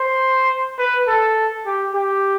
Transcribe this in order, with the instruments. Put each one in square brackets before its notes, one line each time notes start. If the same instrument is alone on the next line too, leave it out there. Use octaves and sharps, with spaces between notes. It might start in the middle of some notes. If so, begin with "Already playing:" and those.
Already playing: [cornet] C5
B4
A4
G4
G4